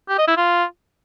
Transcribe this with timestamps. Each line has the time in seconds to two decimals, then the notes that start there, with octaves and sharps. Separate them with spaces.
0.09 G4
0.18 D#5
0.28 E4
0.37 F4